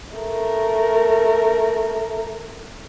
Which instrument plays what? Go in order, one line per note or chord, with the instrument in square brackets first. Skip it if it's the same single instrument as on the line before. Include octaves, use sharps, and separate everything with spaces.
[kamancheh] A3 A#4